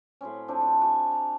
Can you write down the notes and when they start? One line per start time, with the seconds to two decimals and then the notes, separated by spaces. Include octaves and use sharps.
0.21 A2 F#3 C4 C#4
0.48 F3 C4 D4
0.61 D4
0.81 F#4 G#5
1.12 A#5